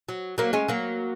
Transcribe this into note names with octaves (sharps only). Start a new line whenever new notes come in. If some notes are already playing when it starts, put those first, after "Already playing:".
F#3
F#3 A#3
G#3 C#4
F#3 A#3